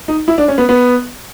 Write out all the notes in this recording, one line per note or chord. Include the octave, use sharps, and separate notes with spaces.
D#4
E4
D4
C#4
B3
B3